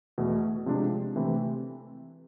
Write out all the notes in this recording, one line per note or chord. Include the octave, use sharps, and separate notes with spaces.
E2 B2 A3
C3 F3 G#3 D4
C3 E3 A3 C4 E4